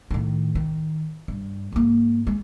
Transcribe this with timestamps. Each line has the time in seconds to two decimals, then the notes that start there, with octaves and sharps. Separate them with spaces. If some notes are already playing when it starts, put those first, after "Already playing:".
0.11 A2 D#3
0.55 D#3
1.28 G2
1.72 G#2 A#3
2.27 G#3